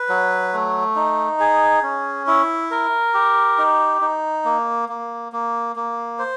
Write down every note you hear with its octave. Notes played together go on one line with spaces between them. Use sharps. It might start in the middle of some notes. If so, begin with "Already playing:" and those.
Already playing: B4
F#3
A3
D#4
G#4
C#4
E4
A#4
G4
D#4
D#4
A#3
A#3
A#3
A#3
C5